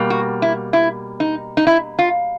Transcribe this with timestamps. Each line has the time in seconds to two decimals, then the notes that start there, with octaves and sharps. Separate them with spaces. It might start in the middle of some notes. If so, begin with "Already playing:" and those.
Already playing: B2 G3 A#3
0.10 F#4
0.42 E4
0.73 E4
1.20 D#4
1.57 D#4
1.67 E4
1.99 F4